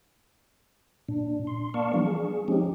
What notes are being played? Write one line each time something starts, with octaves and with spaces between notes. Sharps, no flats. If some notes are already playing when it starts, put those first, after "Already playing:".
A#2 D4
C6
A#3 D5 F5 A5 C#6
E3 F3 G3 B3 D4
G#4
F3 G#3 C4 C#4 D#4 G4